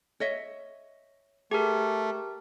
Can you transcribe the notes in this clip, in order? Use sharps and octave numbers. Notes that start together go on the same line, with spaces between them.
C#5 D#5 E5
A3 G4 G#4 A#4